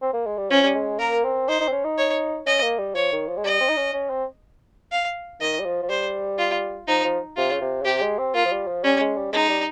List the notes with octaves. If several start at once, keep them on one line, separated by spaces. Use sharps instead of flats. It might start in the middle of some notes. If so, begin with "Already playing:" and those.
C4
A#3
G#3
G3
F3 C#4
G3
G#3
A#3 A#4
C4
D#4 C5
D#4
C4
C#4
D#4
C#5
C#4 D#5
A#3
G3
F3 C#5
D#3
F3
G#3
G3 D#5
C4
D#4
C#4
C#4
C4
F5
D#3 D#5
G3
F3
F3
G3 C5
F4
F3 D#4
F3
C3 F4
C#3
C3
C#3
C3 G4
G#3
C4
A#3 F4
F3
G3
F3
G3 C#4
G#3
G3
G#3 D#4
G3